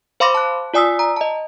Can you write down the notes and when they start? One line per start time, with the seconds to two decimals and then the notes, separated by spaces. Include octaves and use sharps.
0.20 C5 F5 B5 C6 D6 A#6
0.35 A5 F#6
0.74 F4 D5 G#5 D#6 E6 B6
0.99 A#5
1.16 D#5 A5